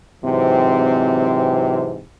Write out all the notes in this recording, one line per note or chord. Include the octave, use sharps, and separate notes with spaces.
G#2 C3 E3 F#3 C4